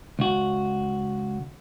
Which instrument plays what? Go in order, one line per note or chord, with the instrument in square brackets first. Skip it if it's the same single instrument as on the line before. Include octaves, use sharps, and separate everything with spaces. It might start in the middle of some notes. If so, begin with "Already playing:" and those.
[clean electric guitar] C#2 F#4